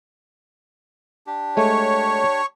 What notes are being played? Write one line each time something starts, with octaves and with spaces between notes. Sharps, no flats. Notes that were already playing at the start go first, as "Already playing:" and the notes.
D4 G4
G#3 A3 C#5